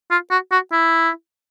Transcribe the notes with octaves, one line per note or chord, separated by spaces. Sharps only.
F4
F#4
F#4
E4